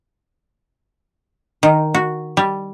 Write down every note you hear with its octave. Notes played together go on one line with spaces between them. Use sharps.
D#3
F#4
G3